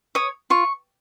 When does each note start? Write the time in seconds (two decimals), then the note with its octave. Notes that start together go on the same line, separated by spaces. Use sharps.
0.15 C#5 D#6
0.50 F4 C#6